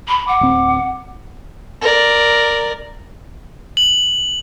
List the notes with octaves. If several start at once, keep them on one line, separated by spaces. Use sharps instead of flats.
B5
F#5 D6
D1 C4
A#4 D5
F#7